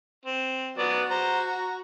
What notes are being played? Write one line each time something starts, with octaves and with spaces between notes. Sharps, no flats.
C4
F#3 B3 F#4 D5
C5 A#5
A#5